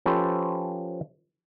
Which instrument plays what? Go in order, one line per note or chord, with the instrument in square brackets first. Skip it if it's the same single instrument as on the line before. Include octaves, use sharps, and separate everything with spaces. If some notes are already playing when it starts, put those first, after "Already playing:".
[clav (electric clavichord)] F3 C#4 G4 A4 B4 C5